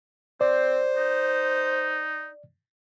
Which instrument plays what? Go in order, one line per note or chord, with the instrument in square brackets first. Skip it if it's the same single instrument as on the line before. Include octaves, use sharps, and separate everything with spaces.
[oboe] C4 [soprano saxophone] C5 [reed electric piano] D5
[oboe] D#4